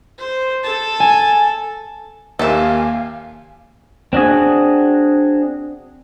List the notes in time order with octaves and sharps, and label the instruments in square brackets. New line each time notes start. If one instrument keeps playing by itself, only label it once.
[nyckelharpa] C5
A4 A5
[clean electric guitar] G#5
[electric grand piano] D#2 A#3 G4 [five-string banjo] A4 E5 [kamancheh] F5 G#5
[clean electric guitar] C4 D4 F#4 G#4